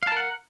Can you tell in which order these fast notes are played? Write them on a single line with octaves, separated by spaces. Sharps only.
F5 A5 A#4 F#5